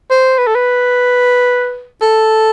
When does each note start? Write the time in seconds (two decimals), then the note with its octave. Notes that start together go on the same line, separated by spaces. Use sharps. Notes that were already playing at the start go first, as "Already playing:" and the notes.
0.11 C5
0.38 B4
0.47 A4
0.55 B4
2.01 A4